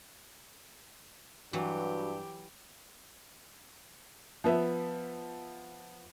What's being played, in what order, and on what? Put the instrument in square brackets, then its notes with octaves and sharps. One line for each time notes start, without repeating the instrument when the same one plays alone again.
[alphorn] G2 [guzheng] E3 F#3 [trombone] F#4 [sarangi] G4
[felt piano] F3 B3 E5